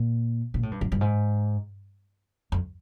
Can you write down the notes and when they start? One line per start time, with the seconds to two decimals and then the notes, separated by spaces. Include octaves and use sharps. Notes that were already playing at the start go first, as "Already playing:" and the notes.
Already playing: A#2
0.54 A#2
0.63 A2
0.71 G2
0.81 F#2
0.92 G2
1.01 G#2
2.52 F2